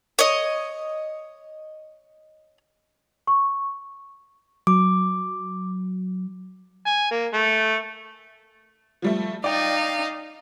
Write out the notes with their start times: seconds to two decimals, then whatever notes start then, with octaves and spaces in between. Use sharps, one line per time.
0.19 C#5 D#5
3.27 C#6
4.67 F#3 D6
6.86 G#5
7.11 A#3
7.33 A3
9.02 F3 G3 A3
9.44 D#4 D5 F5 G5